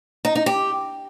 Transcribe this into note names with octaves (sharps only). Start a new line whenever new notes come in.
D#4
D#4
G4